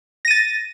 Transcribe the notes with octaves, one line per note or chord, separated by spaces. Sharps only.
A6 A#6 D#7